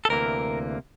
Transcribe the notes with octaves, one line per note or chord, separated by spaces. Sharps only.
A4
D2 C3 E3 A#3 A#4